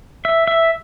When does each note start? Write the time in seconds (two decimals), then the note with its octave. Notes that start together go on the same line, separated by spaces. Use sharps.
0.25 E5
0.48 E5